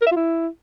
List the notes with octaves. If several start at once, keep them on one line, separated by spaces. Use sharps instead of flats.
A#4
E5
F4
E4